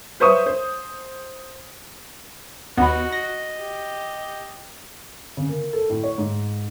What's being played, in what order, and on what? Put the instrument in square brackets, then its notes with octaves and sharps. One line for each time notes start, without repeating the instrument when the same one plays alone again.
[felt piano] B4 C5 E5 C#6 D#6
C5
[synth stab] D#2 B3 [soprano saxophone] D#4 [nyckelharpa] F#4 [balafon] F#5 B5
[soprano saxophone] D#5 [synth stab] A#6
[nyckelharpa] G4
[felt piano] C#3
A#3
A4
A2
C#5
G#2